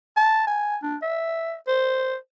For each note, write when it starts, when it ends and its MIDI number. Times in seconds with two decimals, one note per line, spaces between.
0.17 0.46 81
0.47 0.77 80
0.83 0.96 62
1.02 1.54 76
1.68 2.16 72